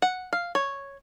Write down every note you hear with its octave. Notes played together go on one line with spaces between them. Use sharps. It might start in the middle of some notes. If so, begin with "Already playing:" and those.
F#5
F5
C#5